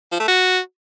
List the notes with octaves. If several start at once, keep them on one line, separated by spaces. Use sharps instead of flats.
F3
A3
F#4